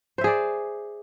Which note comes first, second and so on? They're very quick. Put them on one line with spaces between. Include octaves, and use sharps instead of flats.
C5 E5 G#4 D5